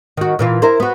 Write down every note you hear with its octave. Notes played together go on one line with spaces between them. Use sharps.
D#3 F#4
A#2 E3 F4
E4 A#4 C5
B3 F#4